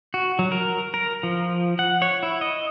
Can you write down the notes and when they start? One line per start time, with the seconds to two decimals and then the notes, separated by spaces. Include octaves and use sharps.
0.14 F#4
0.39 F#3
0.52 A#4
0.94 A#4
1.23 F3
1.79 F#5
2.02 C#5
2.23 E4
2.41 D#5